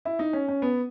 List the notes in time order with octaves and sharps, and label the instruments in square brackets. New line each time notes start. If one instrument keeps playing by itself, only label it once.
[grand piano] E4
D#4
C#4
C#4
B3